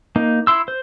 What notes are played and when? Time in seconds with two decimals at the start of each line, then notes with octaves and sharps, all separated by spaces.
0.16 A#3 D#4
0.47 E4 C6 E6
0.68 C5